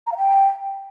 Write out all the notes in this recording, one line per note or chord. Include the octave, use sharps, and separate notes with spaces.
A#5
F5
G5